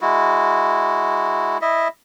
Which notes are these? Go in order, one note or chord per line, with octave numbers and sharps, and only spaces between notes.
G#3 E4 F#4
E4 D#5 E5